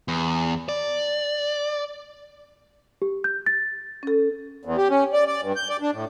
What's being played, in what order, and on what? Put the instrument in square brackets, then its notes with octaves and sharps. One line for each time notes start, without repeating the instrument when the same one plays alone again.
[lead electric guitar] E2
D5
[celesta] G4
G6
A6
[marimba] C#4 A4
[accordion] E2
G4
C#4
D5
D5
G2
G6
D5
D4
A2